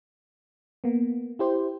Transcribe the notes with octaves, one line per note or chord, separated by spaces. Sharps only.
A#3 B3
E4 G4 C5